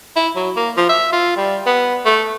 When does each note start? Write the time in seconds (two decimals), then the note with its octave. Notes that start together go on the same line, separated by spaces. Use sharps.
0.16 E4
0.36 F#3
0.56 A#3
0.77 F3
0.89 E5
1.12 F4
1.37 G3
1.66 B3
2.05 A3